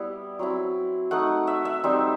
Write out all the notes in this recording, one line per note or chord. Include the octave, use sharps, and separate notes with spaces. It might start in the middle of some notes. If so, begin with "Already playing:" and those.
Already playing: G3 B3 E4
F#3 C4 E4
A3 D#4 F#5
E5
E5
G3 C4 D#4